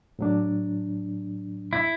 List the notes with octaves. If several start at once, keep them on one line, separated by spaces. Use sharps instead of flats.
A2 F#3 D4
E4